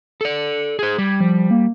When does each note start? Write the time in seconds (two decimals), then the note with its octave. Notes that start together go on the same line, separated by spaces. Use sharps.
0.21 A4 D5 C#7
0.79 G#4 C5 G#6
0.98 G3
1.20 F3
1.51 A#3